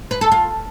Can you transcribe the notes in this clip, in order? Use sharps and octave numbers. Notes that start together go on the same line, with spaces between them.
B4
A4
F4